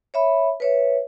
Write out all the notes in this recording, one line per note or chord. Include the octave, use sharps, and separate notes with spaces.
C#5 E5 B5
B4 C#5 E5